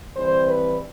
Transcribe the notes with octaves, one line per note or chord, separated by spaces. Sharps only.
E3 G3 C4 C5
B4